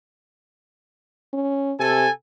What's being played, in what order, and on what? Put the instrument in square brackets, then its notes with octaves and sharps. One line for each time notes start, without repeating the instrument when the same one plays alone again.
[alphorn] C#4
[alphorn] C3 [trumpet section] A4 G#5